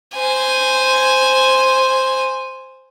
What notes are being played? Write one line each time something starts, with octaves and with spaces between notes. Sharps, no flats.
C5 G#5